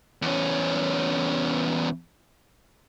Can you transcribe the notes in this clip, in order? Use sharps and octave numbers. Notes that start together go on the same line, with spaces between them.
E2 C#4